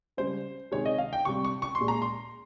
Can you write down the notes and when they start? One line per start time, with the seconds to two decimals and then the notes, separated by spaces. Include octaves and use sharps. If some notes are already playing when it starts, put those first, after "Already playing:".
0.17 C#3 G3 C5
0.72 C3 D#3 G#3 C#5
0.85 D#5
0.98 F5
1.13 G5
1.25 C3 G3 C#6
1.45 C#6
1.62 C#6
1.75 C6
1.80 A#2 G#3
1.88 A#5
2.02 C6